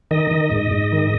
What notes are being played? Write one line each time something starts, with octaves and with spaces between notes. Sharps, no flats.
D#3 D#5
D#3
G#2
G#2
D#3